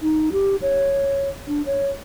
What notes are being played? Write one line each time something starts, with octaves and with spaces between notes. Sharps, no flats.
D#4
G4
C#5
D4
C#5